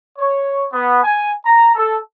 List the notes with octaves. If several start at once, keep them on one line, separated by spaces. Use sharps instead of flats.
C#5
B3
G#5
A#5
A4